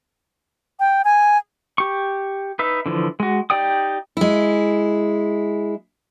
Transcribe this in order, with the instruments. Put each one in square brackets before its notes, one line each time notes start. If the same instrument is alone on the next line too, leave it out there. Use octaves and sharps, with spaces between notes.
[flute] G5
G#5
[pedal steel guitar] G4 C#6
D#4 B4 E5
D3 E3 F3
G#3 F#4
D#4 G4 D5 G5 D#6
[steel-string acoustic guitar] G#3 E4